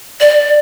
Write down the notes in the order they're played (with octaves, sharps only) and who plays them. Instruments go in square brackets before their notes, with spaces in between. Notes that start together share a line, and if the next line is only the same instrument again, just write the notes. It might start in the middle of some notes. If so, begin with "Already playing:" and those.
[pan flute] D5